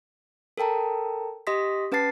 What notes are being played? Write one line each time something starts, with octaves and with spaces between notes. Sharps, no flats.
A4 A#4 G5 A5 A#5
G4 D#5 C6 D#6 A#6 B6
C#4 B4 F#5 A5 A6 C7